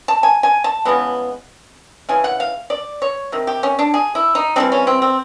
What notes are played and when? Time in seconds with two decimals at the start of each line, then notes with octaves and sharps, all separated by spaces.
0.08 A5
0.23 G#5
0.43 G#5
0.64 A5
0.85 C#3 E3 G#3 B3
2.09 C#3 E3 G#5
2.24 F#5
2.40 F5
2.70 D5
3.02 C#5
3.32 C3 D#3
3.47 G4
3.63 C#4
3.79 D4
3.94 G#4
4.15 E4
4.35 D#4
4.56 E3 G3 C4 D4
4.72 C#4
4.87 C4
5.02 C4